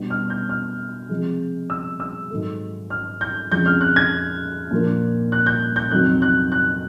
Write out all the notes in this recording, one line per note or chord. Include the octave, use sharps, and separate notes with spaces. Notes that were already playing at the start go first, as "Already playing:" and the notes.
Already playing: B2 G3 B3 D4
F6
G6
F6
C3 F3 G#3
E6
E6
G#2 D#3 F#3 A3
F6
G6
F2 C#3 F3 G#3 G6
F6
F#6
G#6
A#2 F3 A#3 D4
F#6
G6
G6
F2 C3 D#3 F#3 F#6
F#6
F#6